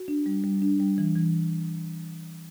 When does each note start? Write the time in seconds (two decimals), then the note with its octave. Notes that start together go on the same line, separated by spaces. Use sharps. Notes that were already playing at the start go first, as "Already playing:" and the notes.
Already playing: F#4
0.08 D4
0.26 G3
0.44 G3
0.62 D4
0.80 G3
0.98 E3
1.15 E3